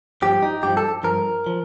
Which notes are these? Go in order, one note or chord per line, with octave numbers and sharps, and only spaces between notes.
G2 F3 G4
D#4
G2 F3 G4
A4
G2 F3 A#4
F3